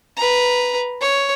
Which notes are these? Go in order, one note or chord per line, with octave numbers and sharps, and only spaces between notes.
B4 A#5
C#5